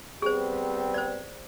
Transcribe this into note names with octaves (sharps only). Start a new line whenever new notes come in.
G3 B3 C4 G#4 C5
C5 D5